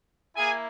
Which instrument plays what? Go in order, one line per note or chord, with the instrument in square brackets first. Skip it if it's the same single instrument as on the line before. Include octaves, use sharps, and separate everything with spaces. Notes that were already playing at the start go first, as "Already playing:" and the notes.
[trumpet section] A#3 E4 G#4 G#5